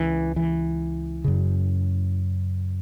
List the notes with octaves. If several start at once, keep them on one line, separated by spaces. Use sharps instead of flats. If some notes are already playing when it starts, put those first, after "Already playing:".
Already playing: C#2 C#3 E3
E3
F#2 C#3